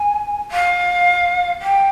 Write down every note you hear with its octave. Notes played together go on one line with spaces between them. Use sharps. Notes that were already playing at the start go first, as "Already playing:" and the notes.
Already playing: G#5
F5
G5